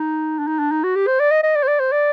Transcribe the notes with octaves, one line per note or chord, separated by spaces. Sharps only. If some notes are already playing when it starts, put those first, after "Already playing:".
Already playing: D#4
D4
D#4
D4
D#4
F#4
G4
C5
D5
D#5
D#5
D5
C5
D5
C5
D5